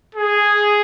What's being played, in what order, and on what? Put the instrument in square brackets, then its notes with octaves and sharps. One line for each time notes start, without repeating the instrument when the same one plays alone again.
[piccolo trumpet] G#4